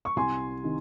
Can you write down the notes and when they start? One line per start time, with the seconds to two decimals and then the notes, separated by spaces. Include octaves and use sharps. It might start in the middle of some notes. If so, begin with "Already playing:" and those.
0.05 C#6
0.16 C2 G#5 C6
0.63 C3 D#3